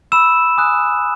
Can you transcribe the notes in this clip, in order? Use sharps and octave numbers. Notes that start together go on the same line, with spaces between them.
B5 E6 E7
G#5 D#6 F#6